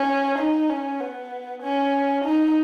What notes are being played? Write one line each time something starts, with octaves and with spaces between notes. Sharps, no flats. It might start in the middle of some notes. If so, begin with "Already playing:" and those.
Already playing: C#4
D#4
C#4
B3
C#4
D#4